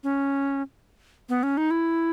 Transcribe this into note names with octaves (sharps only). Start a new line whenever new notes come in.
C#4
B3
C#4
D#4
E4